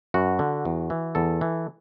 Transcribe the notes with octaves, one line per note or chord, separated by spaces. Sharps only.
F#2 F#4
D3
E2
E3
E2 A4
E3